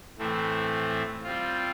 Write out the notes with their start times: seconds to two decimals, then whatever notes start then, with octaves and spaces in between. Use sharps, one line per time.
0.18 A2 E3 A3 C4
1.23 G3 C4 F4